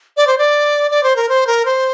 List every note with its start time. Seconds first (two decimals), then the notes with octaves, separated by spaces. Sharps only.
0.17 D5
0.27 C5
0.38 D5
0.91 D5
1.03 C5
1.16 A#4
1.29 C5
1.47 A#4
1.65 C5